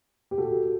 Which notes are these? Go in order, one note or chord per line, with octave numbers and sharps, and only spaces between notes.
G4
F#4 A4